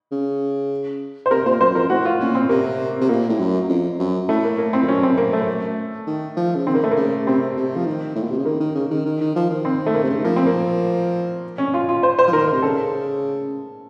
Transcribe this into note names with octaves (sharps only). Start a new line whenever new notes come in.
C#3
C5
C3 A#4
A#2 C5
F#2 C5
F2 A#4
A2 F#4
F4
A#2 C#4
C4
C3 A#3
C3
A#2 A#3
A2
F#2
F2
F#2
A2 A3
A#3
A#3
C4
F2
F#2 C#4
C4
A#3
A3
D#3
F3
C#3
D#3 C4
A#3
A3
A#3
C#3
C3 C4
C3
F3
D#3
A2
A#2
C3
C#3
D#3 A#3
D#3
C#3
D#3
D#3
D#3
F3
D#3
C4
A3
A#3
C3
C#3
D#3
F3 A#3
C4
A#3
C#4
F4
F4
C5
C5
F3
D#3 A#4
C3 A#4
C#3 A4